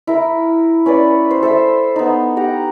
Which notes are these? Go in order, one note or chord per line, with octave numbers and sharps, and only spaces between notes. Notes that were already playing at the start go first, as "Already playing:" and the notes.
E4 A#4
C#4 B4 C#5 D5
C5
A4 C5 E5
B3 D#4
G4 F#5 A#5